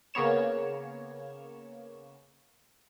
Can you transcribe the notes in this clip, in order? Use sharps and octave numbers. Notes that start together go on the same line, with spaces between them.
C#3 A#3 B3 C#5 E7